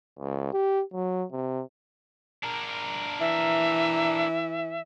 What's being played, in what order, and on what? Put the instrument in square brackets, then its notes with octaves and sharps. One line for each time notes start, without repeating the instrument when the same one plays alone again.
[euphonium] C#2
G4
F#3
C3
[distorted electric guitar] D4 A#4
[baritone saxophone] E3 [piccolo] E5